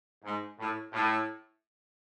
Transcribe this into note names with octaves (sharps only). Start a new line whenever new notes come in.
G#2
A2
A2